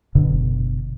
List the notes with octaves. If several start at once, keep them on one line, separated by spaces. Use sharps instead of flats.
F#1 B2 D3